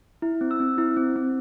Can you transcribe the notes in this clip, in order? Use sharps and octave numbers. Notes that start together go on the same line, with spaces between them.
E4
C4
E6
C4
E4
C4
C4